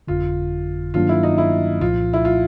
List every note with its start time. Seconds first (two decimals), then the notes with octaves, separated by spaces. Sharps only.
0.08 G1 F2 D3 F4
0.94 G2 D#3 F#3 A#3 D4 F4
1.09 E4
1.23 D#4
1.38 E4
1.81 C2 A#2 F3 F4
2.13 E4
2.25 F4